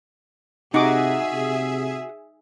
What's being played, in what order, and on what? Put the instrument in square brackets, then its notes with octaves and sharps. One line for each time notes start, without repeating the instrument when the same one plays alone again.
[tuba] C3 [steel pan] D#4 D6 [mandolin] F#4 [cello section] G#4 E5
[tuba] C3